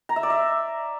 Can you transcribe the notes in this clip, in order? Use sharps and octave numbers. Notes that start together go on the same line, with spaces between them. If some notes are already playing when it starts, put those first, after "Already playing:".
A#5
E5
D5
E5